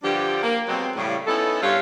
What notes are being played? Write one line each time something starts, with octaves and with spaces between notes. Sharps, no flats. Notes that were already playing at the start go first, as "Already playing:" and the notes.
G2 D3 F3 G3 D4 G4
A#3
B2 F#3 G#3 C4
A2 C#3 G3
B3 C#4 D#4 E4 A4
G2 F4 C#5